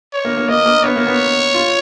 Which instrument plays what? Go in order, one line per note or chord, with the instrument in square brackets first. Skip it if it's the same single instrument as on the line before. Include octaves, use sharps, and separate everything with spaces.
[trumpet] C#5
[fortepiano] A#3
A#3
[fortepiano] A#3 [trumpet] D#5
[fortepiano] A#3
[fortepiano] B3 [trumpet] C#5
[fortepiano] A#3
B3
F4